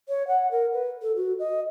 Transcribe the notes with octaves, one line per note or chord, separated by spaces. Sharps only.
C#5
F#5
A#4
B4
A4
F#4
D#5